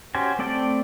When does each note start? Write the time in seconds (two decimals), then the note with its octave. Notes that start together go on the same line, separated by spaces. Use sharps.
0.15 C#4 F#4 G4 C5 G#5
0.39 A3 C4 D5 G5 A5